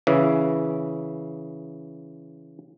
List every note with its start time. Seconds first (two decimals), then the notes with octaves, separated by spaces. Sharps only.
0.07 C#3 E3